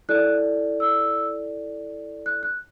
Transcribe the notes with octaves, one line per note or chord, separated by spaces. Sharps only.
E4 A4 D5 F#6
E6
F#6
F#6